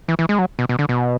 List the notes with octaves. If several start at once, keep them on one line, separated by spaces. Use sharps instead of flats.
E3
E3
G#3
F#3
B2
B2
D3
B2